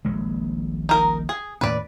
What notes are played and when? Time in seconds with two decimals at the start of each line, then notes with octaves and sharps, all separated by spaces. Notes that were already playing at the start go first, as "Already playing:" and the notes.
0.05 D#1 A#1 G#3
0.89 D#4 A#4
1.29 G#4
1.61 D#2 A2 C#4 B4 D5